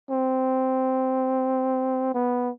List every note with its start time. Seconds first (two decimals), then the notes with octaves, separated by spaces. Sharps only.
0.10 C4
2.14 B3